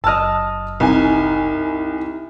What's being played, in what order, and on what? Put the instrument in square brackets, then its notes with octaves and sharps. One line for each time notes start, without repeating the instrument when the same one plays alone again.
[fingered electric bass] F#1 [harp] D#5 A5 [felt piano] E6 F6
[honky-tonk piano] C2 G#5 [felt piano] D#4